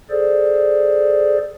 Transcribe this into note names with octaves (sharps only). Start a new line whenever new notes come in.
G#4 A4 C5 D5